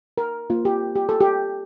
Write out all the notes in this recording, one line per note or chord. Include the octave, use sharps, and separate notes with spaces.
A#4
A#3 F4
G4
G4
A4
G4